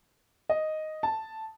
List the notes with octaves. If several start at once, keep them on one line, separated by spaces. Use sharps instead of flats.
D#5
A5